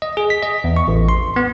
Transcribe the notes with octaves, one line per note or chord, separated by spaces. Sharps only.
D#5
G#4
B6
D#5
E2
C#6
A1
C6
B3